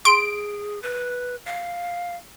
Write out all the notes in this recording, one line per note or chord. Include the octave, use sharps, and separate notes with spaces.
G#4 C6 D7
B4
F5